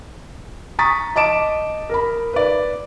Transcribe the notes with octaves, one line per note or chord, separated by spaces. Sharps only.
A#5 C#6 D#6 A6 B6
D#5 A5 D6 D7 E7
A#4 B5
B4 D5